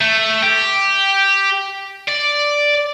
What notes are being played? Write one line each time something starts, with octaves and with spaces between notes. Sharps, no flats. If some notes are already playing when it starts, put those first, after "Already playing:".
A3
G4
D5